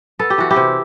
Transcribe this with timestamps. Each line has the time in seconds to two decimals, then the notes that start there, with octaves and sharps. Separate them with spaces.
0.19 B3 A4
0.30 G4
0.38 E3 F#4
0.51 E4 G4
0.56 C3